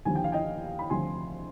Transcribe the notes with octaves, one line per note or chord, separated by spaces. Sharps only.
D#2 D3 F3 G#5
G5
F5
D#5 G5
B5
D2 C3 F3 G#5 C6